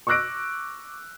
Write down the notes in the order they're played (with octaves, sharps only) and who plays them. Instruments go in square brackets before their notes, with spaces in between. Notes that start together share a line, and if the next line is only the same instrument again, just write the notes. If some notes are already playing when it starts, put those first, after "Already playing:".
[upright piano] C#6 D6 E6 F#6 A#6 D7